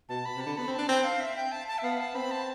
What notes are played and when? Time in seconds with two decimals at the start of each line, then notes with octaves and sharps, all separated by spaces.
0.09 B2 A5
0.25 B5
0.36 C3 A5
0.46 D3
0.57 B3 B5
0.67 C4
0.73 D4 A5
0.88 C4 G5
1.04 F5
1.20 E5
1.36 G5
1.52 A5
1.68 A5
1.78 E5
1.83 B3 F5
2.00 A5
2.15 C4 B5
2.31 A5